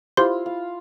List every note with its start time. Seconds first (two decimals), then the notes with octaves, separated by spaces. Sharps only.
0.17 E4 F4 G4 C5 C6
0.46 F5